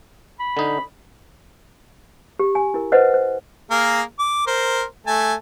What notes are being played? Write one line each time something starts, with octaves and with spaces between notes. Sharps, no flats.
B5
D3 D#4
G4
G#5
E4 A#4
B4 C5 D#5 F#5
C5
A#3 G#4 A#4
D6
A#4 C5
A3 G#5 A5